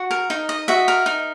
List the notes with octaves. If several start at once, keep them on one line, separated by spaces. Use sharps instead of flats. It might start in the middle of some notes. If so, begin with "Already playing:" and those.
Already playing: F#4
A#4
D#4
D#5
F#4 E5
A#4
D#4